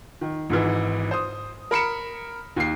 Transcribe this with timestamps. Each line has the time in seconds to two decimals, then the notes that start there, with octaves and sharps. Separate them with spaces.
0.21 D#3
0.50 G#1 G#2 E3
1.11 C5 D#6
1.71 A#4 B5 C#7 E7
2.56 D#2 C7